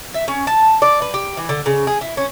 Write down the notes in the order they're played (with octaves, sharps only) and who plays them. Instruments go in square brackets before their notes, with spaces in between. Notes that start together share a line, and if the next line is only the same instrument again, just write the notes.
[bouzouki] E5
C#4
A5
D5
B4
G4
E3
D3
C#3
G#4
E4
C#4